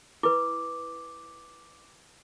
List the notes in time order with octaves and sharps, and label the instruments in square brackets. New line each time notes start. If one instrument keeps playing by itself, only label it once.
[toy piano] E4 B4 [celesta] D6